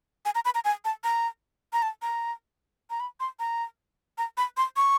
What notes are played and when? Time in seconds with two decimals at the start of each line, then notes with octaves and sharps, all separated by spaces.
0.25 G#5
0.35 A#5
0.45 B5
0.55 A#5
0.65 G#5
0.85 A5
1.04 A#5
1.73 A#5
1.82 A5
2.02 A#5
2.90 A#5
3.00 B5
3.20 C6
3.39 A#5
4.18 A#5
4.37 B5
4.57 C6
4.77 C#6